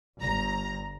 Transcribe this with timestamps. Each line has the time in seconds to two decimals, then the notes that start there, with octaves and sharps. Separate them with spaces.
0.19 G1 A#5